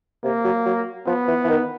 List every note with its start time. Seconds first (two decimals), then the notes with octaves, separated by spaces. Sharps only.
0.24 C3 A#3
0.44 F#3
0.66 F#3
1.06 F3 B3
1.28 E3
1.44 E3
1.49 D#3